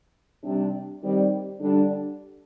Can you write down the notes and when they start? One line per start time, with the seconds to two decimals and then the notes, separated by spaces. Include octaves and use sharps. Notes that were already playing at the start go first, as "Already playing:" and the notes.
0.42 C3 G3 D4
1.02 D#3 G3 C4 G4 D5
1.60 D3 G3 D4